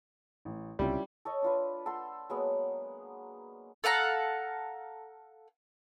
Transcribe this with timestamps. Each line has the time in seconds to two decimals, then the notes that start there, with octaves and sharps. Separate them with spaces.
0.45 A1
0.79 C#2 C3 G3 C4 C#4 E4 F4
1.25 A4 C#5 D#5
1.42 D4 F4 B4
1.86 A4 F#5 C6
2.29 F#3 G#3 A#3 B3
3.84 A4 F5 F#5 A#5